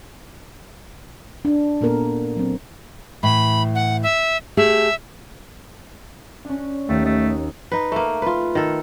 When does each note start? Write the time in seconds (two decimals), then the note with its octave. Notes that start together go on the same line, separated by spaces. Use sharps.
1.45 D4
1.81 A#2 A#3 B3 A4 A#4
2.36 F#3 C4
3.23 A2 E3 B5
3.75 F#5
4.03 E5
4.57 A3 G4 G#4 E5
6.45 C#4 D4
6.89 D#2 A3
7.05 A3 D#5
7.72 D#4 B4
7.92 A3 A#3
8.22 F4 B4
8.55 D#3 A4